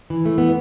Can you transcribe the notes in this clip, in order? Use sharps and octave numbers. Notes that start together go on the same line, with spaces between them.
E3
A3
B3